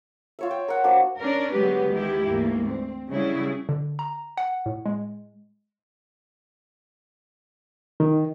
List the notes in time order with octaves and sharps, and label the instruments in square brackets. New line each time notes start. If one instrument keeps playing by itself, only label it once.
[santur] F4 C#5 E5
G5
A#4 E5 F#5 A#5
A#3 D4 F#4 C5
[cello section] C#4 D4 A#4
D3 F#3 G#3 B3 G4 B4
D2 D#3 G#3 E4 G4
D2 G#2 E3 A#3
C4
C#3 F#3 G3 E4 G#4
[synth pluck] D3
A#5
F#5
A2
G#3
[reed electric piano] D#3